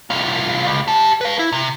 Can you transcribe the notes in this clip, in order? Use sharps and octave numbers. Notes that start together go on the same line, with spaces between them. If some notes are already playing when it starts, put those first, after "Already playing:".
C2 F4
C#2
G4 A5
B4 F5
E4
C3